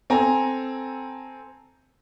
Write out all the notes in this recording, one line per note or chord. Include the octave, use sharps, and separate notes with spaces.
C4 A4 G#5 A#5